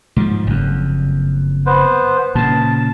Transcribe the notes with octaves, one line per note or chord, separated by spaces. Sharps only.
G#2 F3
F#1 F2
B3 B4 C5
A#2 C#3 A5